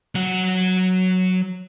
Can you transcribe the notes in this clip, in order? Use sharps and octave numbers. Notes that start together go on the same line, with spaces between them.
F#3 F#5